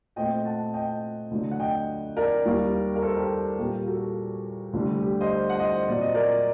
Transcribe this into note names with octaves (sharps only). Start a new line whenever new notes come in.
A#2 A3 C4 D#5 G5
F#5 A5
D#5 G5
D2 D3 F#3
F#5
D#5 G5
A#4 D5
D#2 D#3 G3 A#3
A#4
A4 C5
G4 A#4
A#2 G3 A#3 G4 A#4
F#4 A4
D2 D3 G3
G4
C5 D#5
F#5
C5 D#5
A#2 F#3 C4 D5
D#5
A#4 D5